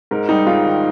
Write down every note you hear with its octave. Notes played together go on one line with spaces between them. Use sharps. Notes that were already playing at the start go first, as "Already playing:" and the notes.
G#2 A#4
G3 D#4
G#2 F4
D#3